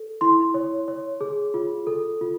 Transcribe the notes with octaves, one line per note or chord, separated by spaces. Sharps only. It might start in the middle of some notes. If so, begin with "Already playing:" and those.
Already playing: A4
E4 C6
C#5
C#5
G#4
F4
A4
F4